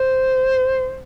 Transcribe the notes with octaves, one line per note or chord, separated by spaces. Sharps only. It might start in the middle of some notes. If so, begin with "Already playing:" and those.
Already playing: C5